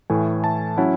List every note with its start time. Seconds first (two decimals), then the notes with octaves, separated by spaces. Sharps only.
0.10 A2 E3 A3 G#5
0.44 A5
0.77 F#3 C#4 E4 F#5